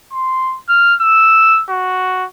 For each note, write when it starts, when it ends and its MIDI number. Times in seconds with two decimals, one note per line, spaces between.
0.13 0.58 84
0.69 0.95 89
1.01 1.62 88
1.69 2.25 66